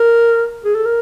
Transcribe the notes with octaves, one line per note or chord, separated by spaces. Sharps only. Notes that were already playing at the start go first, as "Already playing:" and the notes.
Already playing: A#4
G#4
A4
A#4